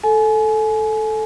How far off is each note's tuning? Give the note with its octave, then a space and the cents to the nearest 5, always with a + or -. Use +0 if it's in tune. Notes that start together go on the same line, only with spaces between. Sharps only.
A4 -5 G#5 +30